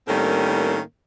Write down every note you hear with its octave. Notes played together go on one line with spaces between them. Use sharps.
A2 D#3 G3 A#3 C4 C#4